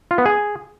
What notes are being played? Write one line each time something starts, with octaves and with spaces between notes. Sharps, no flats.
F4
B3
G#4